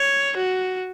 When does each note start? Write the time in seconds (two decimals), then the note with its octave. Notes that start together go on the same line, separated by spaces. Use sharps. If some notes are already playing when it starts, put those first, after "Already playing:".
Already playing: C#5
0.37 F#4